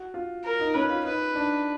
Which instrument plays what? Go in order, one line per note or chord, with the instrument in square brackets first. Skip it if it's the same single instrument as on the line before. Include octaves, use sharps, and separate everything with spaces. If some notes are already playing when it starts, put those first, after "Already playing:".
Already playing: [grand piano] F#4
F4
[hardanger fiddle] A#4
[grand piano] D#4
[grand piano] C#4 [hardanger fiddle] B4
[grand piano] F4
[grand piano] D#4 [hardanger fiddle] B4
[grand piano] D4